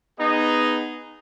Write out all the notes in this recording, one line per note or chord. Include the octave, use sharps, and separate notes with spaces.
B3 D#4 G#4 D#5